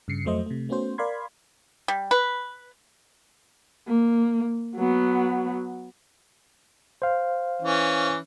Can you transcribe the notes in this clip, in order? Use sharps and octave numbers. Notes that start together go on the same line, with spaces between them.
G2 C#3 C7 C#7
F2 F#3 A3 C5 D#5
C3 A3
A3 B3 C#4 F#4 C5
A#4 D5 F5 B5 C6 G#6
G3
B4
A#3
F#3 B3
C5 F5
E3 C#4